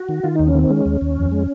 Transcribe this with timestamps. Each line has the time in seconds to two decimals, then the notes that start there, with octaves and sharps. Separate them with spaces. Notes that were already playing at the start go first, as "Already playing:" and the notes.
Already playing: F#4
0.09 D#3
0.23 D#3 F4
0.36 D#2 D#4
0.47 C#4
0.55 D#3 C4
0.70 G#3 C#4
0.86 D#2
1.01 D#2
1.17 F2
1.32 G#3